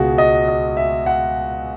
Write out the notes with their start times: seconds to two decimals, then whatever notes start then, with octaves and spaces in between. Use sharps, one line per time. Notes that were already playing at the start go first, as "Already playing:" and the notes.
Already playing: C#2 B2 G#3 F#4 G#4
0.18 D#5
0.48 D#5
0.77 E5
1.06 F#5